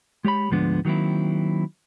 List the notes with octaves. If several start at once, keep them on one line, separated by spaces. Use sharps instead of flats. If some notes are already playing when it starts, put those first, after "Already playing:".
G#3 G4 C#5 B5
D2 G#2 F3 G#3 B3 D4
D#3 F#3 A#3 C4 E4